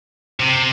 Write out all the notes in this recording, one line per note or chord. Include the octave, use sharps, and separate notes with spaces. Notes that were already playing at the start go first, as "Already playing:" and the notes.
C3